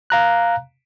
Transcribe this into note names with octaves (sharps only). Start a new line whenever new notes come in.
F5 A#5 F#6